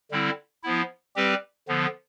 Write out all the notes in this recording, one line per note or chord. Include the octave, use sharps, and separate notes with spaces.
D3 G3 C4 E4
F3 B3 E4
G3 C4 G4 B4
D3 F3 B3